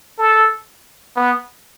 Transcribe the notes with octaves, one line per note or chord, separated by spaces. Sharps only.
A4
B3